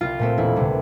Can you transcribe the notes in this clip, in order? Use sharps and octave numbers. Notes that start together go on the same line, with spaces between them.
C2 F4
A#2 A3 C4
E1 E4
D2 C3 G3